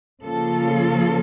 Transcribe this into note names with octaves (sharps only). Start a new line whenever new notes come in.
C#3 F3 A#3 F4 A4